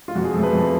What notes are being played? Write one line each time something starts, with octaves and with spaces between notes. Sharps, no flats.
F4
F2 F#4
G#4
F3 A3 A4
B4
F2